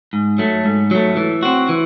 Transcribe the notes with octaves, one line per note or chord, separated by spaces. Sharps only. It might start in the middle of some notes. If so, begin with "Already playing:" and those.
G#2
F#3 A3
G#2
F#3 A3
E3
C4 F#4
E3